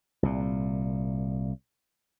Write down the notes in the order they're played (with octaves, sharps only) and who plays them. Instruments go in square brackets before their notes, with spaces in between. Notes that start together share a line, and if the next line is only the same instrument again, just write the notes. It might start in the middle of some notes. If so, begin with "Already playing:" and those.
[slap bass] C2 A#2